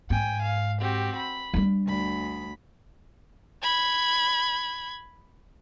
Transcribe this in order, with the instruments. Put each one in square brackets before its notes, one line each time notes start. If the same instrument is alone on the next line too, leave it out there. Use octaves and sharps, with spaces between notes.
[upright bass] G#2 [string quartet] G5 G#5
[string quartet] F5
C4 F#4 G4
B5
[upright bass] G3 D4
[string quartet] D2 B5
[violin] B5 G#6